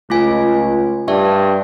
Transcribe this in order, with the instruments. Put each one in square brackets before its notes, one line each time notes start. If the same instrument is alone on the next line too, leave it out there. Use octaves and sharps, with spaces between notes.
[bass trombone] C#2 [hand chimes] A3 F4 G#5
[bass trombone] G2 [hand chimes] D5 E5 C#6